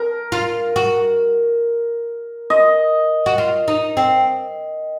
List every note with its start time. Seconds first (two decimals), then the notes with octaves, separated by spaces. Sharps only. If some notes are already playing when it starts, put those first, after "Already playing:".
Already playing: A#4
0.32 F4
0.76 F#4
2.50 D#5
3.26 F#4
3.38 F4
3.68 D#4
3.97 C4